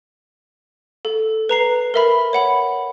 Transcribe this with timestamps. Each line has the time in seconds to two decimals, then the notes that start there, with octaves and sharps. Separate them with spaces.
1.05 A4
1.49 B4 A#5 C7
1.94 A#4 E5 B5
2.33 C#5 F#5 B5